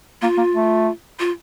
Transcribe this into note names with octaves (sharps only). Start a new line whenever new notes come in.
A#3 F4
A#3
A3
F4